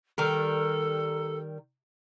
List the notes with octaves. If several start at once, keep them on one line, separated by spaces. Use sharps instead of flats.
D#3 G3 A4 A#4